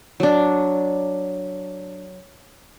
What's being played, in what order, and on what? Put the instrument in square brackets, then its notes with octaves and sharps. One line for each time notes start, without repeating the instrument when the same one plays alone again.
[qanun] F#3 D4